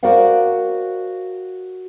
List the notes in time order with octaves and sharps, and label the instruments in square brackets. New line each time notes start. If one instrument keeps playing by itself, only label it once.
[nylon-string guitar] F#4 A#4 C5 D5 F5 F#5